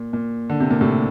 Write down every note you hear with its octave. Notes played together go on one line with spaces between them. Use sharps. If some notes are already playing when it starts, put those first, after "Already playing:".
Already playing: A#2
A#2
D3
C3
A#2
A2 C3